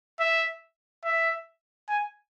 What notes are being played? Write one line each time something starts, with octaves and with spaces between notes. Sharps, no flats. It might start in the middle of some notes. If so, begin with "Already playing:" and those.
E5
E5
G#5